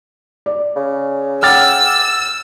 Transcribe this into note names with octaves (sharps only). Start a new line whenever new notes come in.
D5
C#3
F#5 G5 D6 E6 F6 A6